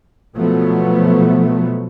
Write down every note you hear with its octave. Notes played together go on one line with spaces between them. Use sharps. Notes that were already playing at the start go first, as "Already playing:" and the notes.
B2 F3 F#3 A3 B3